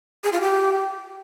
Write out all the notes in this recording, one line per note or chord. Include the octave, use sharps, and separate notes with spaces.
G#4
F4
G4